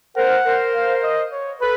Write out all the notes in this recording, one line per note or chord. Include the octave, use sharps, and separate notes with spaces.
A#4 C5 F#5
A#4 C5
F5
D#5
C#5
A4 B4